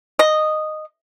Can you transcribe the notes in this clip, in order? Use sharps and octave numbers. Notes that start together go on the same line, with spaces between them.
D#5